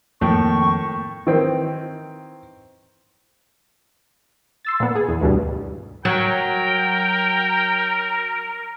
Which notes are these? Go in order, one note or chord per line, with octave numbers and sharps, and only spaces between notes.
F2 A2 D#3 A#3 G5 C#6 G6
D#3 E3 C4
C6 E6 A6
A#2 A#3 B3
G#4
E2
D2 G2 B2 G3
F#3 A#4 G5